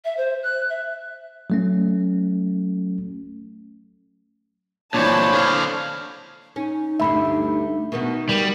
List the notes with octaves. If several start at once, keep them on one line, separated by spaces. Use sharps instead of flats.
E5
C5
F#6
E5
F#3 A3 C#4
A#2 E3 D4 C5 C#5 A5 B5
D3 F5
C#4 D#4
D2 G2 D3 E5 B5
B2 D#3 B3
G3 A#4